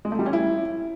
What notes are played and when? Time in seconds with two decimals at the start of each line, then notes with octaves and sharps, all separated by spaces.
0.05 G#3
0.12 A3
0.19 G3
0.26 C#4
0.33 E4